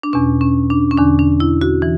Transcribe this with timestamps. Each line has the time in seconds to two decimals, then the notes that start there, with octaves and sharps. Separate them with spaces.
0.03 D4
0.13 E2 B2 C#4
0.41 C#4
0.70 D4
0.91 C#4
0.98 E2 D3 D4
1.19 D4
1.40 E4
1.61 F#4
1.82 E3